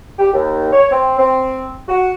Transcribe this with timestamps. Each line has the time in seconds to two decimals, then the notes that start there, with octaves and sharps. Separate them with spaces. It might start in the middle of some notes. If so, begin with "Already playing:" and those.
0.19 G4
0.33 D#2
0.71 C#5
0.91 C4
1.18 C4
1.89 F#4